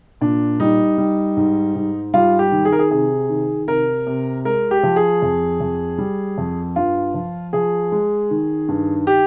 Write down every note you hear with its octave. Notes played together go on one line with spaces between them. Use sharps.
A#2 D4
G3 D#4
G3
G#2
G#2
G3 F4
G4
D#3
G#4
A#4
G#4
C3 G#4
D#3
C3 A#4
C3
G#3 A#4
G4
F3
G#4
F2
F2
G3
F2
G2 F4
F3
F3 G#4
G#3
D#3
G2
G4